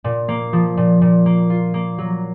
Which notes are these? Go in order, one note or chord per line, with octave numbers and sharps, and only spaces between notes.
A#2
A#3
F3
A#2
A#2
A#3
F4
A#3
F#3